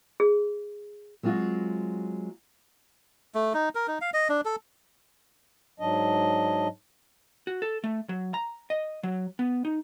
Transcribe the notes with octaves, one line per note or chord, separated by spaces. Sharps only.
G#4
F#3 G#3 C4 F4 F#4
A3
D#4
A#4
D#4
F5
D#5
D4
A4
G#2 F#3 D4 D#5
F#4
A4
A3
F#3
A#5
D#5
F#3
B3
D#4